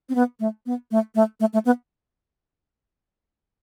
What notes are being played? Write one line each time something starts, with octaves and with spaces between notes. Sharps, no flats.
C4
B3
A3
B3
A3
A3
A3
A3
B3